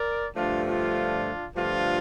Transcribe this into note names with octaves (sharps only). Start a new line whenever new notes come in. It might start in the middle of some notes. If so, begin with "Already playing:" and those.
Already playing: A#4 D5
G2 D3 F3 A3 D4 F4
D4 F4
G2 D3 F3 A3 D4 F4